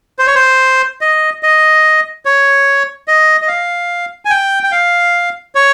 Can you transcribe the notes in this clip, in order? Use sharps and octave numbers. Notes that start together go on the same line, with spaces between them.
C5
C#5
C5
D#5
D#5
C#5
D#5
D#5
F5
G#5
G5
G5
F5
C#5